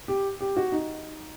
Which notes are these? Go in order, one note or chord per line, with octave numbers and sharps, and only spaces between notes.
G4
G4
F#4
D#4